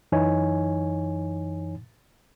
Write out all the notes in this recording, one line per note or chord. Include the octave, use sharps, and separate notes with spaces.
F#2 E3 D#4 C#5 G#5